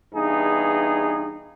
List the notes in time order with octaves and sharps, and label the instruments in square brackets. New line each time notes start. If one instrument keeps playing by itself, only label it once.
[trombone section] E2 G2 D#4 G#4